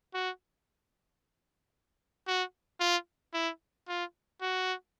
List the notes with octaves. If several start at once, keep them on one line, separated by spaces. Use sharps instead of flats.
F#4
F#4
F4
E4
F4
F#4